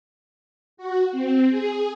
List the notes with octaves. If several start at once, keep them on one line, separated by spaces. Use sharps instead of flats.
F#4
C4
G#4